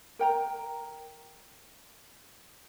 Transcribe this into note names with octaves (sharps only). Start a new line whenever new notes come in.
A#4 G5 A#5